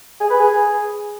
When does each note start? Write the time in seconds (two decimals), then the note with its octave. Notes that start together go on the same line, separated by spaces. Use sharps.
0.21 G#4
0.30 B4
0.40 G#4